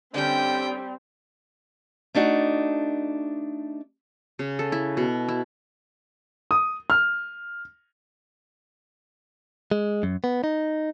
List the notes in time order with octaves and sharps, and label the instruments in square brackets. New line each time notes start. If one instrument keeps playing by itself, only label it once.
[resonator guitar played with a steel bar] D3 C#4 [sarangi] G3 [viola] C4 [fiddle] G5
[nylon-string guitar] A3 D4 D#4 F#4
[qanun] C#3
A4
E4
B2
E4
[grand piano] D#6
F6
[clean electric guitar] G#3
F#2
B3
D#4